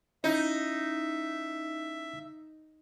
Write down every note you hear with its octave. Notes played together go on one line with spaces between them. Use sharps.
C#4 D#4 E4 E5